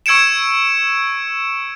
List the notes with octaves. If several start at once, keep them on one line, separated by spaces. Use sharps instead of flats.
C#6 E6 G#6 C#7 D7 E7